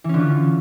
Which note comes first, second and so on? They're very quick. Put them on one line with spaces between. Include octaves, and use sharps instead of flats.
E3 C#4 D3 F4